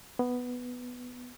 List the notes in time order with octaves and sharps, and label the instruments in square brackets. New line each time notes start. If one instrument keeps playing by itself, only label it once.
[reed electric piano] B3